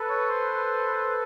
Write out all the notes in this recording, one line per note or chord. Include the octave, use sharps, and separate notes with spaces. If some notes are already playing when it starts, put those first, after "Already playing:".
Already playing: A4 B4
C#5
C5